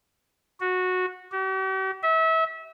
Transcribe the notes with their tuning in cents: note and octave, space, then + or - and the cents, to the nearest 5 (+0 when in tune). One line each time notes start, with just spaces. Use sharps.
F#4 -15
G4 -45
E5 -30